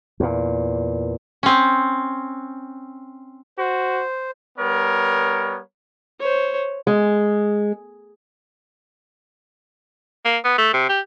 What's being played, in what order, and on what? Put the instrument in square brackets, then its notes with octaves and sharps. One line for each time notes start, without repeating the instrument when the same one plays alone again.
[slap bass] E2 A#2
[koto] C4 C#4
[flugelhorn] F#4 [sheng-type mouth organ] C5
[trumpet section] G3 B3 A#4 C#5
[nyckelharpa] C5 C#5
[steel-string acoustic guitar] G#3
[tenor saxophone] A#3
B3
A3
C3
G4